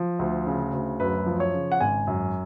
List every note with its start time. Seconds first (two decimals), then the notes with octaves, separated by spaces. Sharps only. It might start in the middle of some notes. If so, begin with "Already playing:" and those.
Already playing: F3
0.19 D2
0.47 C#3
0.74 D2
1.00 F#2 B4
1.26 F3
1.40 C#5
1.54 C#3
1.72 F#5
1.81 G#1 G#5
2.07 F#2